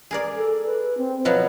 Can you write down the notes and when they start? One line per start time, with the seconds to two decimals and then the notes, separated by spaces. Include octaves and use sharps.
0.11 G#4 A#4 D5
0.36 A4
0.66 B4
0.97 C4
1.25 B2 F3 F#3 B4